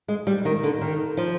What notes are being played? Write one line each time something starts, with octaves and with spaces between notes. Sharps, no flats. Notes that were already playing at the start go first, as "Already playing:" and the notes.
G#3
G3
D#3
D3
D#3
F3